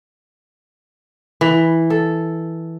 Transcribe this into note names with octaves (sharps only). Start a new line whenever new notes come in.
E3
A4